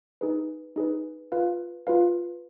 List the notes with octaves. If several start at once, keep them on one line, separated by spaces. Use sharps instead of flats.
D#4 G#4 B4
D#4 G#4 B4
F4 B4 F5
F4 B4 F5